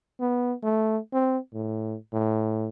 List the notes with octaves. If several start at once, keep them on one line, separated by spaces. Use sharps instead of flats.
B3
A3
C4
A2
A2